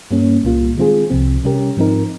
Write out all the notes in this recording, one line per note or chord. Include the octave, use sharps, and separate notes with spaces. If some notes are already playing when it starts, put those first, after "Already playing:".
G2 G3 A#3 C#4
C2 A#2 G3 A#3 F4
D#3 G#3 C4 F4 G#4
C2 C3 F3 C4
C3 G3 C#4 G4 A#4
G#2 F3 C4 D#4 A#4